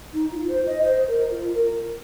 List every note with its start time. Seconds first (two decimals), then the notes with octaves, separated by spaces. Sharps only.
0.13 D#4
0.32 F4
0.48 C5
0.66 D#5
0.84 C5
1.07 A#4
1.31 F4
1.54 A#4